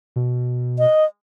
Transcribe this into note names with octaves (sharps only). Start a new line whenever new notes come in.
B2
D#5